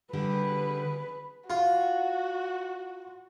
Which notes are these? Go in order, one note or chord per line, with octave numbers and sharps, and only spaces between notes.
D3 G3 G4 G#4 B4
F4 F#4